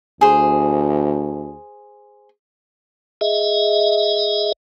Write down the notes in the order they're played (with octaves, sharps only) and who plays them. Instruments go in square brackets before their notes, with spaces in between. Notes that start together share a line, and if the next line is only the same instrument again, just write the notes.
[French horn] D2 [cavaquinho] G#4 C5
[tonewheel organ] G#4 D#5 E5